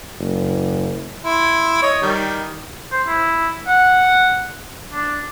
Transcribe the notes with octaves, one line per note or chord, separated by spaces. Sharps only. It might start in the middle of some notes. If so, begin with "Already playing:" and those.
F#1
E4 C6
C#5 D#5
D#3 G3
C5
E4
F#5
D4